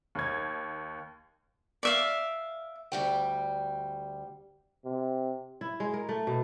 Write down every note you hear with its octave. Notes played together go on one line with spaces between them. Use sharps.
D#2 G#6
D5 E5 F5
D2 G3 G5
C3
E4
G#3
A#4
A3
B2